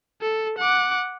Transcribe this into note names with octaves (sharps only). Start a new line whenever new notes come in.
A4
F#5 D6